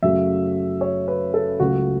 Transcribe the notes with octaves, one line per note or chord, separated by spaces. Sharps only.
F#2 C#3 F#3 A3 E5
C#5
B4
A4
C#2 C#3 F#3 A3 F#4